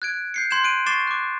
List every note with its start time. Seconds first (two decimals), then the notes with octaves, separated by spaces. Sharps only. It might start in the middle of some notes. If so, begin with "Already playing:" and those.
0.02 F#6 G#6 D7
0.34 G6 C7 C#7
0.51 C6 G6 G#6 E7
0.64 F#6 D7 D#7
0.86 C#6 D6 A6 C7 E7
1.07 D6 F#6